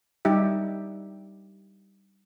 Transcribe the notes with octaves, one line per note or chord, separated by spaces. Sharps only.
G3 D#4 G4 E5